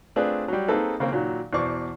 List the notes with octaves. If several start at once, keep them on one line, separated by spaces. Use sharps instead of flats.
A3 C4 D4 F4 G#4 B4
F#3 G3
A#3 C4 D#4 G#4 A4 B4
C#3 A#3 C4
A#2 D#3 F#3
E2 B2 C5 D5 C#6